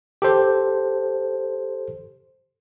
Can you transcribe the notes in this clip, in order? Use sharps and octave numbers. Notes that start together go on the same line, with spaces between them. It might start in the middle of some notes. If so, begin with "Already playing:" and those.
G4 A4 C5